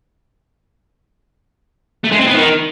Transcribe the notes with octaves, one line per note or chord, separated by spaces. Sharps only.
A3
G#3
C4
B3
D#3